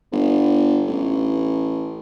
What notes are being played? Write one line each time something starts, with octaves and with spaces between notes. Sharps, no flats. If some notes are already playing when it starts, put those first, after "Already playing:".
G1
A1